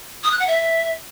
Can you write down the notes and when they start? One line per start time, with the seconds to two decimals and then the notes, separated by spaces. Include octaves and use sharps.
0.24 D#6
0.32 F#6
0.39 F#5
0.47 E5